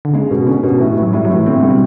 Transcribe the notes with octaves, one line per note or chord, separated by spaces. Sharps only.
D3
C#3 G#3
B2
D3 C#4
B2
A2 E3
A2 E3
F#3
A2 G3
A2 F#3
E3
D3 C4
C#3
D3 G3
B2